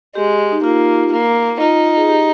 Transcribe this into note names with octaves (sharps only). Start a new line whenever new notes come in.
G#3 G4
D#4
A#3 F4
A#3
D#4 F4
G#4
G4